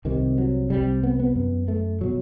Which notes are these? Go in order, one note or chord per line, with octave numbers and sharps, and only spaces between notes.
C2 C3 D#3
F#3
C2 C3 G3
B3
B3
F#2
A3
B2 F#3